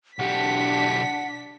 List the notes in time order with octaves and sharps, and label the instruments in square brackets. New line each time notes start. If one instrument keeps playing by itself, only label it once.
[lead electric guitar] B1 G4 [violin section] D4 B6 [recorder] F#5